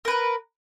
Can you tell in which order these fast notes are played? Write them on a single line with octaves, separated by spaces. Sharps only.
A#4 B4 A#5